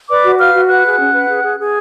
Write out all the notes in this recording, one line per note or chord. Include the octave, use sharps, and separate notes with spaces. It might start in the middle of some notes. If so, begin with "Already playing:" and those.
B4 D5 D6
F#4
B4 F5 F6
F#4
B4 F#5 F#6
G#4
C#4
B4
G#4
G#4
G#4